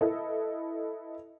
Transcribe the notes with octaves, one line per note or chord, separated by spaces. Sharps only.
E4 A4 B4 D#5